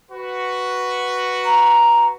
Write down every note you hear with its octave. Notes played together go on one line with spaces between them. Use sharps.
F#4 B4
A#5